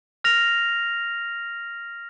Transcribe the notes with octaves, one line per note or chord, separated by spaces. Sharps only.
F6 A#6 F7